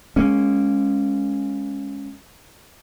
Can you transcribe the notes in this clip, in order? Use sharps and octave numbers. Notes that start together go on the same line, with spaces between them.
G#3 A#3 C#4